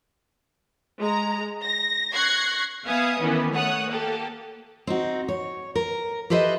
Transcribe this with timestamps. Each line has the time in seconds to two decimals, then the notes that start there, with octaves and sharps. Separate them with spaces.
0.99 G#3 A#5
1.65 A#6
2.13 C#6 F#6 G#6 A#6 C7
2.86 B3 E5 F5 G#5 D#6 C#7
3.20 D#3 E3 B3 C#4
3.52 A3 C#5 F#5 D#6 F#6
3.89 A#3 G4 A4
4.87 C4 D#4 F#4
5.28 C#5
5.75 A#4
6.30 G4 A4 B4 C5 D#5 E5